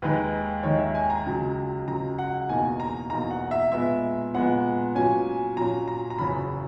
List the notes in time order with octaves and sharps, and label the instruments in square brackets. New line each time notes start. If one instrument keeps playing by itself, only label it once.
[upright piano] D#2 D#3 G#3 D#4 [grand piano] B4
[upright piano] D#2 D#3 G#3 D#4 [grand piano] C#5
[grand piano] E5
G#5
A#5
[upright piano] C#2 C#3 F#3
[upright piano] C#2 C#3 F#3 [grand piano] A#5
[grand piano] F#5
[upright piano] E2 B2 A#3 D#4 [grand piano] G#5
[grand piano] A#5
[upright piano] E2 B2 A#3 D#4 [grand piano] A#5
[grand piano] F#5
E5
[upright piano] A#2 G#3 B3 [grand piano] E5
[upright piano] A#2 G#3 B3 [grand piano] F#5
[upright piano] A#2 F#3 C#4 [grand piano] G#5
[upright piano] A#2 F#3 C#4 [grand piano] A#5
[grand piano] A#5
A#5
[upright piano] F#1 E2 C#3 F#3 C#4 [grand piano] B5